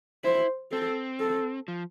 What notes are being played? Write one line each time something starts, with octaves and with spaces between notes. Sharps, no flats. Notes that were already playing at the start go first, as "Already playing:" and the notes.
E4 C5
C4 A4
A4
F3